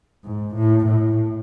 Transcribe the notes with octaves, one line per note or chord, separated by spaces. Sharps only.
G#2
A2
A2